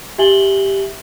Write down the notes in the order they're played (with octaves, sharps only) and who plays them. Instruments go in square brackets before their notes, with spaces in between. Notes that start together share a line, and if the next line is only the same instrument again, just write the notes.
[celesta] G4 E5 G#5 F#7 G7